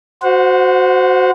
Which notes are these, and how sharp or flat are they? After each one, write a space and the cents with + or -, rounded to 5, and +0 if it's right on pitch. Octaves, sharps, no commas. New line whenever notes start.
F#4 +0 C5 -15 F#5 -35